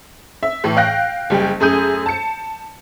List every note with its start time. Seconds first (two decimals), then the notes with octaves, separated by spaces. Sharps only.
0.43 E5
0.64 A2 E3
0.77 F5 G5 F#6 A#6
1.30 F#1 G3 G#4 G5
1.60 F#2 A3 G#4 D#6 G6 D#7
2.06 A5 C#7